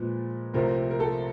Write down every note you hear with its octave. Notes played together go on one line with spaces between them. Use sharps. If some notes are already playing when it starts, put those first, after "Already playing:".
Already playing: A#2 F3 G#3 B4
C2 C3 F3 A3 C4 A#4
A#4
A4